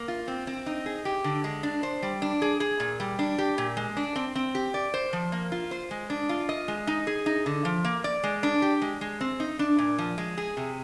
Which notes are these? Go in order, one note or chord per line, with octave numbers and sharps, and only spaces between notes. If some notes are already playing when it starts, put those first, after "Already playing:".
Already playing: A#3
F4
C4
C4
D#4
G#4
G4
D3
G#3
D4
C5
G3
D4
G#4
G#4
A#2
G3
D4
G4
A#2
G#3
D4
C4
C4
G4
D5
C5
F3
A#3
F4
C5
G#3
D4
F4
D#5
G#3
D#4
G#4
D#4
D3
F3
A#3
D5
G#3
D4
G4
G#3
G#3
C4
D#4
D4
A#2
F3
G#3
G#4
C3